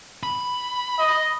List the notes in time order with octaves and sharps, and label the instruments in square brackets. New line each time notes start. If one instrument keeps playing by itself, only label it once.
[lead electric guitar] B5
[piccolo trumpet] D#5